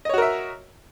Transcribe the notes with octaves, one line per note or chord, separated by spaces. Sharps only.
F#4 A#4 C#5 D#5 E5